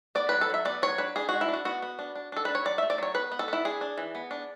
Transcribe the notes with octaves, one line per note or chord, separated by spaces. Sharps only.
B3 D5
F#3 B4
A4
F#3 E5
B3 D5
F#3 C#5
D4 B4
D4 G#4
G#3 F#4
E4
D4
F#4
B3 F#4
B3
D4
D4
D4 A4
D4 B4
C#5
F#3 D5
A3 E5
D5
F#3 C#5
B3 B4
B3
A4
B3 E4
D4 G#4
D4
E3
B3
D4